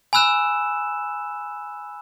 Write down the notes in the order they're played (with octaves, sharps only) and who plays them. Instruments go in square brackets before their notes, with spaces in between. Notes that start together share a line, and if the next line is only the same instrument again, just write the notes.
[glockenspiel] G#5 B5 E6 F#6 E7